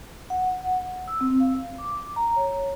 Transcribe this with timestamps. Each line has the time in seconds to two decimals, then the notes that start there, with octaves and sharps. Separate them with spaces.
0.30 F#5
1.08 E6
1.21 C4
1.40 F5
1.78 D6
2.16 A#5
2.36 C#5